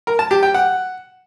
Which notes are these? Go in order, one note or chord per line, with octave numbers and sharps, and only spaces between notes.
A#4
A5
G4
G5
F#5